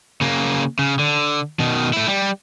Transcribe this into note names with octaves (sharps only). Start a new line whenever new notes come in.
C#3 A#3
C#3
D3
B2 D#3
A3 E4
G3